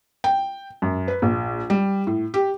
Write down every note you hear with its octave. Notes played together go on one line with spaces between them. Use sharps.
G5
F#2
B4
A#1
G3
A2
G4